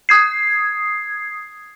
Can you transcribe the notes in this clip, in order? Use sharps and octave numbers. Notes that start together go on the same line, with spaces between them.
D#6 G#6 C7